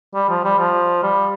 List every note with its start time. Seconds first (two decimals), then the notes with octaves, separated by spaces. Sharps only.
0.15 G3
0.29 F3
0.44 G3
0.58 F3
1.03 G3